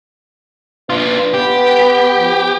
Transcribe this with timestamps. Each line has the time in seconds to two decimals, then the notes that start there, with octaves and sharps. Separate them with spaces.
0.90 D4 F4 B4
1.34 B3 G4
2.18 F3